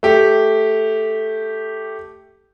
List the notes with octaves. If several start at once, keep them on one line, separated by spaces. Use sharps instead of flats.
A3 G4